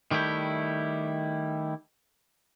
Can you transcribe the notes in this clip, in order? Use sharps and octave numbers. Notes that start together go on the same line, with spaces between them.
D#3 G3 A3 E4 G4